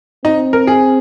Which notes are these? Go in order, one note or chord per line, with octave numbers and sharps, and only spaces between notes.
C4 D#4
A#4
G#4